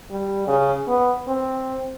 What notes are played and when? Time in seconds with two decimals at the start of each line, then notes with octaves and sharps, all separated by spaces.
0.11 G3
0.47 C#3
0.87 B3
1.28 C4